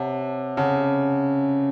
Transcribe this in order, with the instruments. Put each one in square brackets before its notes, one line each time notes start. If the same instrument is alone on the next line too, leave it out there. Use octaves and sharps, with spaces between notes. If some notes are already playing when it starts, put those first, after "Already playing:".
Already playing: [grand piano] C3 [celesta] C#5 F#5 A5
[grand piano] C#3 [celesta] C#5 F#5 A5